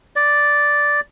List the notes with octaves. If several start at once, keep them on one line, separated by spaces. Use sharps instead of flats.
D5